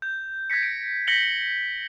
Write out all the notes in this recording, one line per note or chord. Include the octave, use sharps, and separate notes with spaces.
G6
G6 G#6 A#6 B6 C#7
D7
G6 A#6 B6 C#7 F#7 G7